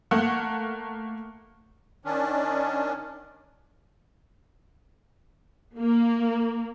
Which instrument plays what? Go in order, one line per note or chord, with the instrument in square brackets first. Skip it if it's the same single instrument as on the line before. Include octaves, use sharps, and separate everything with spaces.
[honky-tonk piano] A3 A#3 F#5
[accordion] D#3 C#4 D4
[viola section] A#3